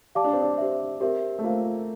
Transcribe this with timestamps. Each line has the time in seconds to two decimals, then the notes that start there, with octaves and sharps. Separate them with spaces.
0.15 G4 D5 F5 A5 D6
0.24 D4
0.33 C4
0.42 D4
0.58 G4 C5 E5
1.01 C4 G4 A#4 E5
1.39 A3
1.44 A#3 F4 C5 F5